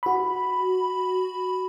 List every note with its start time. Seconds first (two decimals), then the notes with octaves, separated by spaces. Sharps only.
0.03 F#4 B5